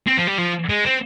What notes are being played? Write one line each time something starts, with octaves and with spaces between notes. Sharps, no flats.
C4
F3
G3
F3
G#3
C4